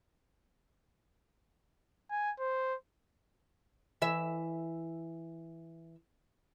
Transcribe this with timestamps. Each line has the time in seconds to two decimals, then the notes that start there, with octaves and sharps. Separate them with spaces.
2.11 G#5
2.40 C5
4.02 E3 E5